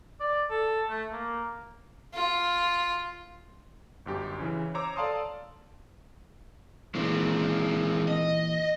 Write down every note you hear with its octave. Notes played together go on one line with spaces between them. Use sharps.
D5
A4
A3
A#3
F4
G1 F#2 G4
C#3 E3 C#4
C5 C#5 A#5 D6 E6
A4 D5 F5 A5 C6 D#6
A#2 E3 G#3 C4
D#5